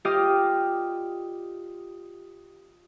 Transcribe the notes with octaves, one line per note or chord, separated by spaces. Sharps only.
F4 G4 D5 D#5 D#6 F6